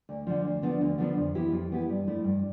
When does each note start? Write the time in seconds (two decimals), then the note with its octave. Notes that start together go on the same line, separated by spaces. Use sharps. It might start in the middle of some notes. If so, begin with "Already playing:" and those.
0.09 D2
0.27 D3 F3
0.45 D2
0.62 D3 F3 B3 D4
0.81 D2
0.98 D3 F3 B3 D4
1.17 F2
1.35 E3 B3 E4 G4
1.52 F2
1.70 E3 B3 E4 G4
1.89 G2
2.07 F3 A3 E4
2.24 G2